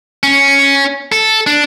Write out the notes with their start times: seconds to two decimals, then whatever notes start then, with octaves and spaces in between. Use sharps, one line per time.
0.23 C#4
1.12 A4
1.47 D4